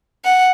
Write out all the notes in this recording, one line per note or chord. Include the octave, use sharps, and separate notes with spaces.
F#5